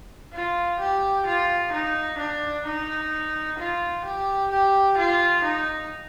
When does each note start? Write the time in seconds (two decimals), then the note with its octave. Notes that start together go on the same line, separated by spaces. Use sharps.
0.33 F4
0.80 G4
1.26 F4
1.72 D#4
2.19 D4
2.65 D#4
3.58 F4
4.05 G4
4.51 G4
4.97 F4
5.44 D#4